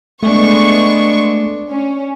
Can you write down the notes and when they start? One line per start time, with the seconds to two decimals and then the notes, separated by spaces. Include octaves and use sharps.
0.23 G#3 A3 B3 D4 C#6
1.71 C#4